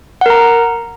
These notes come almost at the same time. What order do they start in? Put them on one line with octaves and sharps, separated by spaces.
F#5 A#4 A#5